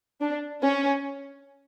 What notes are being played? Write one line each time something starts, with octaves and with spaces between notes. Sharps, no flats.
D4
C#4